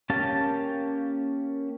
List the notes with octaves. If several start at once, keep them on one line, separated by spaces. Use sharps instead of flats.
A#3 C#4 G4 F5 A5